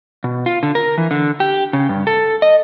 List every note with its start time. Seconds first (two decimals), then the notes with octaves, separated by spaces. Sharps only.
0.24 B2
0.46 F4
0.63 D3
0.75 A#4
0.98 E3
1.11 D3
1.40 G4
1.73 C#3
1.89 G2
2.07 A4
2.42 D#5